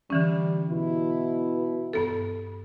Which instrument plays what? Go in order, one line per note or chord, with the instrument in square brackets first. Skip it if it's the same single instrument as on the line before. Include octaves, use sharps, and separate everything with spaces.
[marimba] D3 E3 C#4 [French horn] G3
[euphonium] B2 [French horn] E4
[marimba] G2 B3 A4